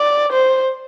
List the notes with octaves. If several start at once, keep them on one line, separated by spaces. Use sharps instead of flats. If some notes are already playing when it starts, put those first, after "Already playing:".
Already playing: D5
C5